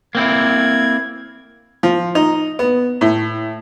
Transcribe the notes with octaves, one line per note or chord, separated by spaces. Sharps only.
A#3 C4 E4 G#6
F3
D#4
B3
A2